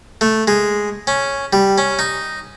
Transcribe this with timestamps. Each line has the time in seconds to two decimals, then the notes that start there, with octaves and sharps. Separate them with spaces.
0.21 A3
0.48 G#3
1.07 C#4
1.53 G3
1.78 C#4
1.99 D#4